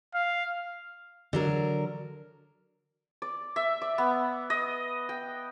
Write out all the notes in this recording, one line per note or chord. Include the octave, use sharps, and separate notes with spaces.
F5
D3 F#3 A#4
D5
E5
D5
B3
D#5
G5